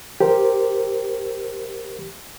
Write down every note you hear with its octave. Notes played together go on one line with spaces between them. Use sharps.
G4 A#4 C5